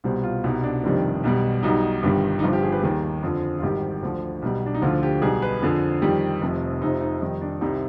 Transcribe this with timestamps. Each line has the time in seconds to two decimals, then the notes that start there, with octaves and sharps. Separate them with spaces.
0.04 C2 B2 G3 C5
0.24 F4
0.43 C2 B2 G3 D#4
0.63 D4
0.83 F1 F2 C3 D#3 G3 D4
1.24 B1 B2 G3
1.63 B1 B2 G3 D#4
2.03 G1 G2 D#3 G3
2.39 D#4
2.42 G1 G2 F3 F4
2.53 G4
2.63 G#4
2.72 B4
2.82 D#2 D#3 G3 G#4
3.23 F2 D3 F3
3.58 F4
3.62 G#1 G#2 D#3 G3 G4
4.02 D2 D3 F3
4.42 B1 B2 G3
4.66 D4
4.74 D#4
4.82 D2 D3 F3 F4
5.03 G4
5.22 B1 B2 G3 G#4
5.42 B4
5.62 F2 D3 F3 G#4
6.01 F2 D#3 G3 G4
6.42 F1 F2 C3 F3
6.82 F1 F2 C3 F3 D#4
7.01 D#4
7.21 F2 D#3 G3 D#4
7.41 D4
7.61 C2 C3 G3 D#4